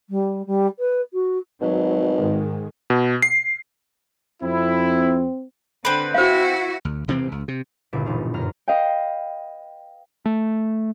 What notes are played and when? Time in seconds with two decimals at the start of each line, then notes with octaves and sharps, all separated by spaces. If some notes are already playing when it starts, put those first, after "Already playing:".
0.10 G3
0.46 G3
0.79 B4
1.14 F#4
1.61 G#1 B2 F#3
2.17 G#2 D#3 G#3
2.90 B2
3.22 C7
4.43 F2 C4 E4
5.85 D3 C4 B4
6.14 E4 F#4 C5 F5
6.85 D2
7.08 E1 C3 E3 C4
7.32 C#2
7.48 C3
7.93 G1 C#2 A#2 E4 D7
8.05 E1 D#4 F4 D7
8.34 G1 F#2 A#5 F6
8.68 B4 D#5 F5 G5
10.26 A3